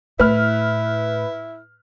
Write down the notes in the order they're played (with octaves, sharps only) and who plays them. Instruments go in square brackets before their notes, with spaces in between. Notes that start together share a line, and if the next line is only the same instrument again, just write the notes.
[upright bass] A2 [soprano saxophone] E4 [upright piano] B4 F6